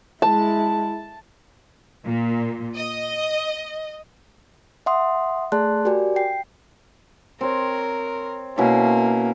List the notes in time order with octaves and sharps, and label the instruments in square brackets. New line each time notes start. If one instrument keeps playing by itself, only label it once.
[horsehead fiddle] G#3 E4 [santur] A5
[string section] A#2
D#5
[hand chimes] E5 F#5 C6 D#6
A3 G#4 D5 A5 C6 F#6
F#4 G4 A#4 D5 G#5
G5 C7
[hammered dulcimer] C4 C#5 [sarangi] A#4
[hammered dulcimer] B2 C#4 E4 [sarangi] A#3